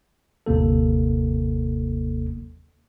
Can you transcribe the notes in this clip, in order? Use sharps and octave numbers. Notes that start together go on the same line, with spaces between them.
G1 D#2 C3 A#3 A4